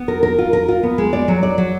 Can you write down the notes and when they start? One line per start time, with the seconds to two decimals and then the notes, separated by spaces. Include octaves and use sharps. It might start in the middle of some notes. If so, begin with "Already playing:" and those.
Already playing: B3
0.08 A#4
0.23 A#4
0.38 F4
0.53 A#4
0.68 F4
0.83 B3
0.98 G#3
1.13 D5
1.28 F#3
1.43 D5
1.58 F#3